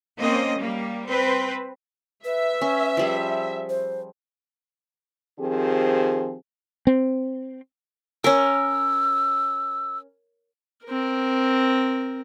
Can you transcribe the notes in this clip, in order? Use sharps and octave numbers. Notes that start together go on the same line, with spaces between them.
A#3 C4 C#4 D#5
G3 A#3
C4 B4
B4 E5
C#4
F3 G3 G#4
C5
D#3 F3 C4 G4 G#4
C4
C#4 A#4 E6
C4 A#4